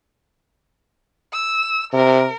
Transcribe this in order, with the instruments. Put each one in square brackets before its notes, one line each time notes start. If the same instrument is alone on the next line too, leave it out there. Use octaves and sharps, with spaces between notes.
[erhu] E6
[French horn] C3 [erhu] A#4